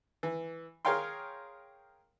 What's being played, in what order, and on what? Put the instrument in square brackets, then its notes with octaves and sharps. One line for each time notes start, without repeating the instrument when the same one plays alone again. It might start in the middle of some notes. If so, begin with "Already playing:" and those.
[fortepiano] E3
G#4 A#4 C#5 F5 G5 C6